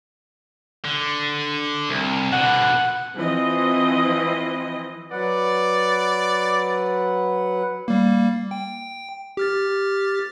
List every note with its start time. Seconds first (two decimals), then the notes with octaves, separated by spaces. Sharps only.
0.85 D3
1.89 C2
2.32 B2 D3 F#5
3.15 E3 F3 C4 D#5
5.12 F#3 B4 D5 F#5
7.88 G3 A#3
8.51 G5
9.37 G4 F6 A6